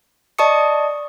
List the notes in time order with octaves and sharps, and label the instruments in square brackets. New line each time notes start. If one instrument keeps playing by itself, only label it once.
[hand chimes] D5 D#5 A5 C#6 D#6 C#7